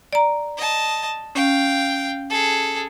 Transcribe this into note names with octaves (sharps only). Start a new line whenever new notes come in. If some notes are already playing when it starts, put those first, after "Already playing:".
D5 A#5
D#5 A5
C#4 F5 G5
G#4 A4